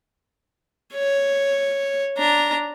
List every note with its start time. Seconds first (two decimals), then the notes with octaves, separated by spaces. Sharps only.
0.94 C#5
2.17 D4 A#5